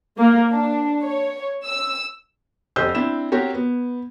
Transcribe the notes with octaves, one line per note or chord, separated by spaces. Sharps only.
A#3
D4
C#5
E6
F1 G4 C5 D#5 E6 G6
C4 D4 E4 E7
C4 F#4 G4 A#4 C#5
B3